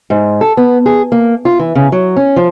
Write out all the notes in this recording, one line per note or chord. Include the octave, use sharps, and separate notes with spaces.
G#2
A4
B3
G#4
A#3
F4
E3
C#3
F#3
C#4
F3